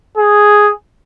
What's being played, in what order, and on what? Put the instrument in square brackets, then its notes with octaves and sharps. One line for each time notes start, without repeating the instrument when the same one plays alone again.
[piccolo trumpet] G#4